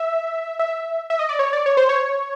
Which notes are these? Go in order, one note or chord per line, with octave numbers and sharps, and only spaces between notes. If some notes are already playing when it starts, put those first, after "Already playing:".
Already playing: E5
E5
E5
D#5
D5
C#5
D5
C#5
C5
C#5